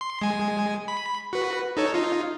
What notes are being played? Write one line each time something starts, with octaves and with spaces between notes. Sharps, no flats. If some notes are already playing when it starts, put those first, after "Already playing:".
C6
G#3 G#5
B5
F#4 B4
D#4 A4 C#5
D#4 F4